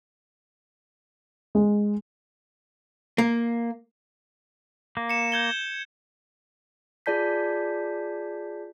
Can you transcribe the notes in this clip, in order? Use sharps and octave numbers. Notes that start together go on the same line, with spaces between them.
G#3
A#3
A#3
C#7 E7
G6 G#6 G7
F4 G#4 D5 A5 G6 B6